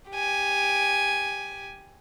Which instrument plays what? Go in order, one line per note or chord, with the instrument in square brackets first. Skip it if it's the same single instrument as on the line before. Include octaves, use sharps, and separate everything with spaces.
[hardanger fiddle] G4 G#5